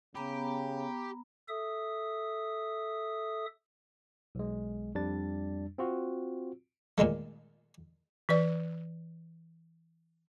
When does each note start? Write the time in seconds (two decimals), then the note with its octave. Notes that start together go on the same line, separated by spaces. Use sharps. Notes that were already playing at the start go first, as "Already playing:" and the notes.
0.15 C#3 B3 G4 A#5 B5
1.48 A4 E5 D#6
4.35 B1 G#3
4.95 F2 G3 D4 A6
5.78 C4 F4 F#4
6.98 A#2 D#3 G#3 A3
8.29 E3 B4 D5